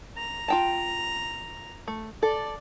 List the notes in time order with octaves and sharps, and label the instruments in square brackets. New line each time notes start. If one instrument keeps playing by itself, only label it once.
[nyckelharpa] A#5
[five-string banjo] F4 G5 A5
A3
[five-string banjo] A4 [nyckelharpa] D5